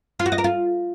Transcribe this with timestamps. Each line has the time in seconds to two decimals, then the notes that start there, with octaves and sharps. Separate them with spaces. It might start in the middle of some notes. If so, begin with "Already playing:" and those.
0.19 F4
0.26 F#4
0.32 D#5
0.38 A#4
0.44 F4